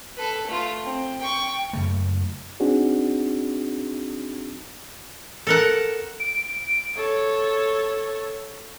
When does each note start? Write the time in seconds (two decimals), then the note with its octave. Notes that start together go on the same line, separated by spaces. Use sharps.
0.17 A4 B4
0.47 A3 F4
0.84 C4
1.19 G5 C#6
1.73 F#2 C#3 A3
2.60 C4 D4 D#4 F#4 G#4
5.47 A4 A#4 F#5
6.20 D7
6.96 A4 C#5